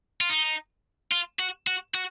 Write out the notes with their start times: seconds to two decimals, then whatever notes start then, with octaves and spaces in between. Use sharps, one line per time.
0.21 F4
0.29 D#4
1.12 F4
1.39 F#4
1.67 F#4
1.95 F#4